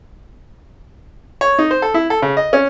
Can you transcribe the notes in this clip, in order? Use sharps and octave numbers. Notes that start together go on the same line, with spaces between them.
C#5
D#4
C5
A4
E4
A4
C#3
D#5
C#4